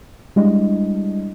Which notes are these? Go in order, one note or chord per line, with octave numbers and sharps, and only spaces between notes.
G3 G#3 D4 E4 D#5